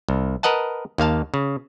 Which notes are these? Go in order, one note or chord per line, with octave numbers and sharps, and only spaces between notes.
C2
A#4 B4 D#5 F#5 A5
D#2 A#3 F5 A5
C#3